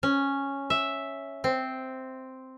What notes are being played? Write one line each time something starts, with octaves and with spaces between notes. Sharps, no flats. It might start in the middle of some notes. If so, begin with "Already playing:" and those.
C#4
E5
C4